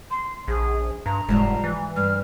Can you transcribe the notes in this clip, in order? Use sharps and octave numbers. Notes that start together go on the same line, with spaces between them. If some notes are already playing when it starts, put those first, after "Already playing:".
C6
A#1 G#4
G2 A#5
F1 G#2 F3 G3
E3
G2 F6